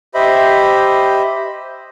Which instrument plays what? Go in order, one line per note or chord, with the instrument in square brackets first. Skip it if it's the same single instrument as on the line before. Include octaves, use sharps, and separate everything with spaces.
[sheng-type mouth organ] G4 C5 D#5 E5 B5